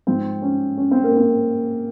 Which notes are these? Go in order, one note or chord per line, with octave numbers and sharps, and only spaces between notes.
G#2 F3 C4
C#4
C#4
C4
A#3
C4